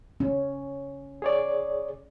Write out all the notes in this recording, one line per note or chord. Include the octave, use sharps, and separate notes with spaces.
C#4
G#4 C#5 D5